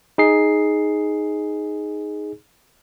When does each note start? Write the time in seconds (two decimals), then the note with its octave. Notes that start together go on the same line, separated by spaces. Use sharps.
0.18 D#4 G#4 C7